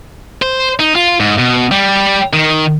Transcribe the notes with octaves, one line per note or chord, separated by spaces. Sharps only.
C5
D#4
F4
G#2
B2
G3
D#3